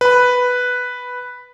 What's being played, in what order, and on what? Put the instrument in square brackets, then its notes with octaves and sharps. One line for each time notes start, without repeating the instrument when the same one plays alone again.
[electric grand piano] B4 B5